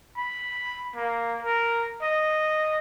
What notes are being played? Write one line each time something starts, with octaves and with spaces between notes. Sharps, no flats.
B5
A#3
A#4
D#5